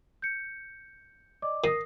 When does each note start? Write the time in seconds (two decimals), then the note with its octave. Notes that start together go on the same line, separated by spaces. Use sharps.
0.22 G6 C#7
1.42 D5 D#5 D6
1.64 D#3 D#6 A#6 C7